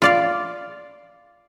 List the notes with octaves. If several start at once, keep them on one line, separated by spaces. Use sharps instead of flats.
F4 D5 F5